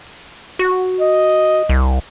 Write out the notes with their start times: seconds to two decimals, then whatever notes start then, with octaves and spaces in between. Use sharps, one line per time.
0.59 F#4
1.00 D#5
1.69 C2